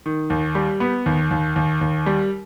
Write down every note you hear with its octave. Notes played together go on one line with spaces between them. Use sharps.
D#3
D#2
G3
B3
D#2
D#2
D#2
D#2
G3